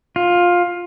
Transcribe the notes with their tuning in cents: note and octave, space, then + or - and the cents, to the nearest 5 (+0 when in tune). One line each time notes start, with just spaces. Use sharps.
F4 +15